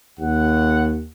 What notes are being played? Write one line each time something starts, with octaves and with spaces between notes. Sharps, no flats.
D#2 F#5